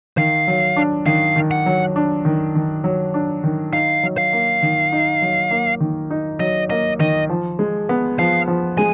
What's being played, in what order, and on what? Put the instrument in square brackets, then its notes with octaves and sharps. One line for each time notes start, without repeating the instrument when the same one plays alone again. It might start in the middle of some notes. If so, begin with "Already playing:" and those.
[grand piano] D#3 [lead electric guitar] F5
[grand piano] F#3
D4
[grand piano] D#3 [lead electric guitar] F5
[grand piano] D#3
[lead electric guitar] F#5
[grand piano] F#3
D4
D#3
D#3
F#3
D4
D#3
[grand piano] D#4 [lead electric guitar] F5
[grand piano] F#3
[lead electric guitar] F5
[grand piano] A#3
D#3
D#4
F#3
A#3
D#3
D#4
[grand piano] F#3 [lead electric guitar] D#5
[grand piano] A#3 [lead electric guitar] D#5
[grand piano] D#3 [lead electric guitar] D#5
[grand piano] F3
G#3
B3
[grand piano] F3 [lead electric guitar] F5
[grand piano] F3
[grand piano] G#3 [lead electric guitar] G#5